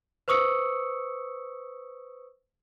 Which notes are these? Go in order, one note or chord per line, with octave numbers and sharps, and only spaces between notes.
B4 C5 C#6 D#6 E6 C#7